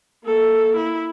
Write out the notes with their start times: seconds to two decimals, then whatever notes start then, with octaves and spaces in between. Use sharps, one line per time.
0.24 A#3 A4
0.76 E4